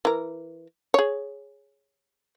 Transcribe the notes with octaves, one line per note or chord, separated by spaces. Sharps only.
E3 A#4
G#4 C#5